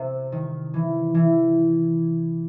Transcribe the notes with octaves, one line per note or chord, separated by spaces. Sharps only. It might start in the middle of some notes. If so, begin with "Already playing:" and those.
Already playing: C3
D#3
E3
E3